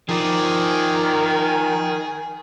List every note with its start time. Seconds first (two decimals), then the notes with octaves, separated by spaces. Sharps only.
0.09 D#3 F3 G#4 D5